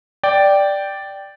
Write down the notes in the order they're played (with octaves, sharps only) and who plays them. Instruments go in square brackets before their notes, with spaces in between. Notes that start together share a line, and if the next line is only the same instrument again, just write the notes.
[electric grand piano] D5 G5